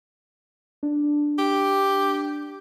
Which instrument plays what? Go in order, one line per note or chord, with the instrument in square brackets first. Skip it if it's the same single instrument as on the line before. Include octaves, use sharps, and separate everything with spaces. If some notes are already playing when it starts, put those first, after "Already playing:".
[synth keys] D4
[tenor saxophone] G4